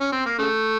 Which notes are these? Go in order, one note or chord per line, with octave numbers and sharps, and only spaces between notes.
C#4
C4
A#3
C#3 A3